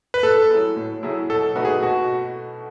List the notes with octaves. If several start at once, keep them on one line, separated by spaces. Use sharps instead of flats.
B4
A2 A4
F#3 A3 E4 G#4
A2
F#3 A3 E4 G#4
B2 A4
A3 D#4 F#4 B4
G#4
B2 F#4